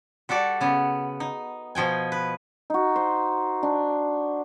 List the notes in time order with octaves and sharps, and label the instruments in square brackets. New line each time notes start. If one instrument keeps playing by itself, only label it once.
[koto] G3 F#4 A4 D5
C#3 B3
D#4
B2 F3 G5 G#5
B4
[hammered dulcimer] D#4 F#4
C5
D4